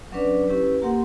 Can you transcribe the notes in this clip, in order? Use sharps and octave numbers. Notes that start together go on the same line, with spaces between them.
F#3 C#4 D4 B4 D5
C#4 E4 G4 B4
A#3 G4 A#4 F#5 C6